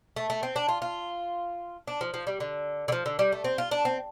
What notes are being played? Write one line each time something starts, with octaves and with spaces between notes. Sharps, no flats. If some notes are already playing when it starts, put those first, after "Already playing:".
A3
A3
C4
D4
F4
F4
D4
F3
F3
G3
D3
D3
F3
D3
G3
A3
C4
F4
D4
C4